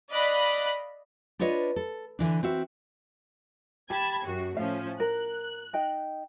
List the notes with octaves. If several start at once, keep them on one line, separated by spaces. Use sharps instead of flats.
D5 D#5 F5 B5 F#6 B6
D4 F4 B4 C#5 D#5
A4
D3 E3 D4
C4 F#4 E5
G4 A5 B5 G#6
F#2 F#4
A2 F3 C#4 F5
A#4 F#6
D#4 D#5 G5